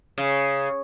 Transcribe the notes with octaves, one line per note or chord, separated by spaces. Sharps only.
C#3